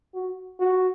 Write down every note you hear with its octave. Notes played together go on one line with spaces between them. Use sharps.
F#4
F#4